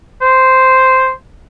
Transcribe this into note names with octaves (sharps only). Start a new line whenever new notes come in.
C5